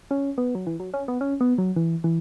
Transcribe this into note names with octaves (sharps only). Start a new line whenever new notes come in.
C#4
B3
F#3
E3
F#3
C#4
B3
C#4
B3
F#3
E3
E3